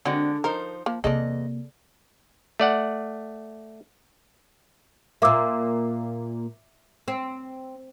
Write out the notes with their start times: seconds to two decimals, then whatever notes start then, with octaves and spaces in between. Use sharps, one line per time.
0.05 D3 G#3 C4 F#4 D5
0.44 F3 D#4 A#4 C5
0.86 F3 A#3
1.04 E2 C3 A#3 G#4 A4 D5 D#5
2.60 A3 D5 F#5
5.22 A#2 A#3 E5 D6 E6
7.08 C4